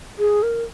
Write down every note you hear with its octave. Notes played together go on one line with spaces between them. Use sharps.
G#4
A#4